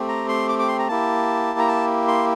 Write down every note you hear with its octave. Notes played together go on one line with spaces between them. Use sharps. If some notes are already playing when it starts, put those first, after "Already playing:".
Already playing: A3 C4 G4
A#5
C6
D6
D6
C6
A#5
A#3 E4 G4 A5
A#5
A5
C6